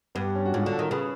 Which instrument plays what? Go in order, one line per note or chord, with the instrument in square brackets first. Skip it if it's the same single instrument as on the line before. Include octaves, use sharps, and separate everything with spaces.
[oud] G2 [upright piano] B3
[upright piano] C#4
F#4
[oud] G#2 [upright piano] F4
[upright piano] F#4
[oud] D3
[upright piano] A4
[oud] D#3 [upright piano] A#4
[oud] C#3 [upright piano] B4